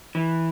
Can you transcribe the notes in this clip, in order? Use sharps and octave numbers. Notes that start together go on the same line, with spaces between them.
E3